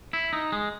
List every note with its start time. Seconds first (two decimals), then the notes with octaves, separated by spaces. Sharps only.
0.13 E4
0.33 D#4
0.52 G#3